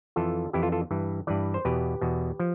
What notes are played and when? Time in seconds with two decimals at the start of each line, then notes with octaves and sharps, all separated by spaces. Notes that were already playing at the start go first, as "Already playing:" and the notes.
0.16 F2 E3 F4 A4
0.53 F2 E3 E4 G4
0.62 F4 A4
0.72 F4 A4
0.91 G2 E3
1.27 G2 E3 B4 D5
1.54 C5
1.65 E2 B2 G4 B4
2.01 E2 B2
2.39 F3